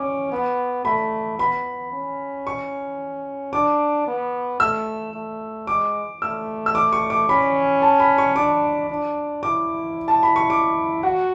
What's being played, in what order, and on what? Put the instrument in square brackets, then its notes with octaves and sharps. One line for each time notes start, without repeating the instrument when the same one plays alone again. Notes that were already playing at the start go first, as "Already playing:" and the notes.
Already playing: [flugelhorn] C#4 [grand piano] D6
[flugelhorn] B3
[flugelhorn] A3 [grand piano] B5
[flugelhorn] B3 [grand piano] B5
[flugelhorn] C#4
[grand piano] C#6
[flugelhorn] D4 [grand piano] D6
[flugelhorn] B3
[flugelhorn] A3 [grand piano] E6
[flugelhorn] A3
[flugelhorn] G#3 [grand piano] D6
[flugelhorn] A3 [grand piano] E6
[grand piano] E6
D6
C#6
D6
[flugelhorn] C#4 [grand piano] B5
[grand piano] A5
B5
C#6
[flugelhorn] D4 [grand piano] D6
[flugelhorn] D4
[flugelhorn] E4 [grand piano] D6
[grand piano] A5
B5
C#6
D6
[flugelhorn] F#4 [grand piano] F#5